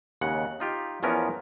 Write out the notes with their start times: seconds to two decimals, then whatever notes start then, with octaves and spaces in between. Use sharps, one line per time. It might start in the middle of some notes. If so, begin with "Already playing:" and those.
0.21 D#2 C#3 G#3 F#5
0.60 D#4 F4 G4
1.03 E2 E3 F3 B3 C#4 A#4